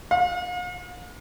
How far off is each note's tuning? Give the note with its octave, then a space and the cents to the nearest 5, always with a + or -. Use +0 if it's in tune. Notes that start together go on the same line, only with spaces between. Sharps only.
F5 +45